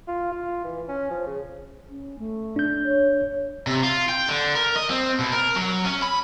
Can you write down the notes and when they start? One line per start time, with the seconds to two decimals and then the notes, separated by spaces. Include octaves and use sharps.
0.08 F4
0.32 F4
0.64 E3
0.88 C#4
1.10 F3
1.27 C#3
1.89 C#4
2.18 A3
2.56 D4 G6
2.84 C#5
3.67 C3
3.83 F4
4.09 G5
4.28 D3
4.55 A#4
4.76 D#5
4.90 C4
5.19 B2
5.32 A#4
5.56 F#3
5.85 C#4
6.02 B5